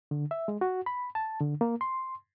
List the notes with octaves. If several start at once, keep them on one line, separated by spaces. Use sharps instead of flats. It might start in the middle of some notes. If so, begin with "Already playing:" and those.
D3
E5
G#3
F#4
B5
A5
D3
A#3
C6